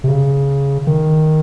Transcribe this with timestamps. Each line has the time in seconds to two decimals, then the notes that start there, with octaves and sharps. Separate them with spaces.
0.04 C3
0.08 C#3
0.87 D#3